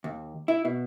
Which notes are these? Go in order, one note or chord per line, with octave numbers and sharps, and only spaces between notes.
D#2
E4
B2